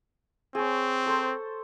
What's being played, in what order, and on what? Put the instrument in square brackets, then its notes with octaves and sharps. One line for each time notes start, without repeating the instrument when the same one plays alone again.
[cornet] C4 [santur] G#4 C#5
[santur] A4 C5